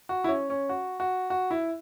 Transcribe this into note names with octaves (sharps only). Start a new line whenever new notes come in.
F#4
E4
C#4
C#4
F#4
F#4
F#4
E4